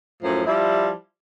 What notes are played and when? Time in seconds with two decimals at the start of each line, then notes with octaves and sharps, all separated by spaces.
0.22 F#2 A2 F3
0.46 F3 G3 E4